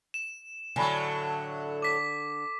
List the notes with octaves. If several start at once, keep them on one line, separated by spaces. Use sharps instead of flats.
E7
A2 D3 F#3 G#5 A5 B5
D6 B6